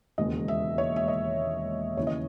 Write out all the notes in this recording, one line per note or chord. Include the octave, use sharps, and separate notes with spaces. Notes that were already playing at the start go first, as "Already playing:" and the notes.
E1 D#2 C#3 G#3 D#5
E5
C#5
E5
D#5
D#2 C#3 E3 C#5
D#5